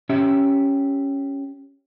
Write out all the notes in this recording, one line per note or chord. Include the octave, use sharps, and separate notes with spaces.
C#4 G4 E5